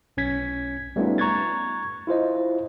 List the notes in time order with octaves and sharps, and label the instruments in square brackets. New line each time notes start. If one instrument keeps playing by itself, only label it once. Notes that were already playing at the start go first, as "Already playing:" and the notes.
[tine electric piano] B1 C#4 G#6 B6
G3 A3 B3 C#4 D#4 F4
A#5 C#6 F#6 G#6 A6
E4 F4 C5 D#5